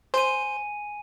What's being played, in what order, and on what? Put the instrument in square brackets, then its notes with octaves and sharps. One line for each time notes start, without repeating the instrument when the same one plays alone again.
[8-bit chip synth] C5 [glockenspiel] G#5 D#7